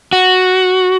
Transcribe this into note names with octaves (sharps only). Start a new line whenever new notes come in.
F#4